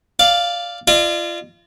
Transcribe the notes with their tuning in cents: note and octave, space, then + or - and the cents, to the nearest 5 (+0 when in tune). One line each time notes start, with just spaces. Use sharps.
D5 +0 F5 +0
F4 -30 D5 +45